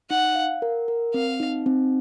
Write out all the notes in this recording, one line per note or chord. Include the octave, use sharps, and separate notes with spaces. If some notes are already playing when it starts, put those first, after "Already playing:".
D#4 F#5
F5
A#4
A#4
C4 F5
D#4
C4